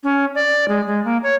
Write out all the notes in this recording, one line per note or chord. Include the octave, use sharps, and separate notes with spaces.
C#4
D5
G#3
G#3
A#3
C#5